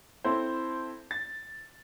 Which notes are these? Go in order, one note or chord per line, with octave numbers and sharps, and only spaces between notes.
C4 E4 A4 C5
A6